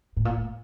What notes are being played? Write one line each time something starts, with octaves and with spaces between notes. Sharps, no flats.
A2
A#2
A2